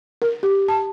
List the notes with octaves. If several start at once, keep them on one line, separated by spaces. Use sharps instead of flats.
A#4
G4
A5